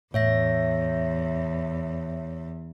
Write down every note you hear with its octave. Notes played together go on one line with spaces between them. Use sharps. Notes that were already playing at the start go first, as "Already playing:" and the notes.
E2 A2 C#5 E5 A#6